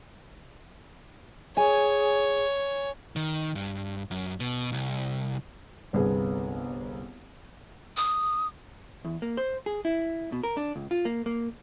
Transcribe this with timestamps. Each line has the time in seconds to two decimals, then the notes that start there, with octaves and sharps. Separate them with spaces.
1.57 G#4 C#5 G#5
3.16 D#3
3.55 G2
4.11 F#2
4.40 B2
4.72 C2
5.93 G1 C2 B3 G#4
7.97 D#6
9.05 E2
9.22 A#3
9.37 C5
9.66 G#4
9.85 E4
10.32 B2
10.43 A#4
10.57 D4
10.76 C#2
10.91 F4
11.05 A#3
11.26 A#3